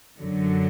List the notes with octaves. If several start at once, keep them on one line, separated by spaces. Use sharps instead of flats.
F#2 D3 F#3